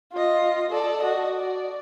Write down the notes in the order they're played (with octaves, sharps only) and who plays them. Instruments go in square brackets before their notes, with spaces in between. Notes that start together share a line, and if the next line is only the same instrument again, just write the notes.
[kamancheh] F4 D#5
A4 D5
F#4 D#5
D5